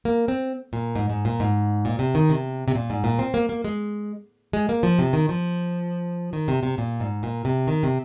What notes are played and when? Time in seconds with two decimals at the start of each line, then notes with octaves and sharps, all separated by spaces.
0.05 A#3
0.28 C4
0.73 A#2
0.95 G#2
1.10 G#2
1.25 A#2
1.40 G#2
1.85 A#2
1.99 C3
2.15 D#3
2.29 C3
2.68 C3
2.75 A#2
2.90 G#2
3.04 A#2
3.19 C4
3.34 A#3
3.49 A#3
3.64 G#3
4.53 G#3
4.69 A#3
4.83 F3
4.99 C3
5.13 D#3
5.29 F3
6.33 D#3
6.48 C3
6.63 C3
6.78 A#2
7.00 G#2
7.23 A#2
7.45 C3
7.68 D#3
7.83 C3